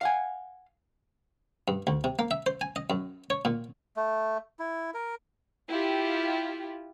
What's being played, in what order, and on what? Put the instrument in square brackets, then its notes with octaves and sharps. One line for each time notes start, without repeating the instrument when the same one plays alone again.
[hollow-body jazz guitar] F5 F#5 G#5
[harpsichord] G2
D2
C3
A#3
E5
C5
G#5
D#5
F#2
C#5
A#2
[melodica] A3
E4
A#4
[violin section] E4 F4 G4